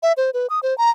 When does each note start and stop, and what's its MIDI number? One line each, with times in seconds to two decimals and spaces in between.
0.03 0.13 76
0.17 0.30 72
0.34 0.47 71
0.50 0.60 87
0.63 0.76 72
0.78 0.90 82